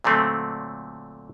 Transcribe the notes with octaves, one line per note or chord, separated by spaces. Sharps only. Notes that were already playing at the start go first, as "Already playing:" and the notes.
A#2 D3 F#3 A3 C4